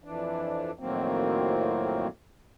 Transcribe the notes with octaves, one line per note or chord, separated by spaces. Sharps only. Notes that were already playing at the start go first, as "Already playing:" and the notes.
F2 E3 D4
F2 A2 D#3 F#3 A#3 C4